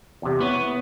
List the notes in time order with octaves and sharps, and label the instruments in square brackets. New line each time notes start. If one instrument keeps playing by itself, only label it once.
[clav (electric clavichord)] E2 C3
[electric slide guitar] B3 [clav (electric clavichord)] E4 C#5